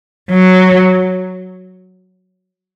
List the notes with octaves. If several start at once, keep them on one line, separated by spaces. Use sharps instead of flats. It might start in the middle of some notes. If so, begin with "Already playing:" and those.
F#3